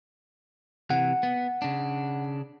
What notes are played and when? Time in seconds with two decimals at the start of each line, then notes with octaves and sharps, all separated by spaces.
0.90 C3 E3 F#5
1.23 B3
1.62 C#3 D4